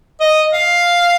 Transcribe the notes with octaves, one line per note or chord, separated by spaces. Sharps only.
D#5
F5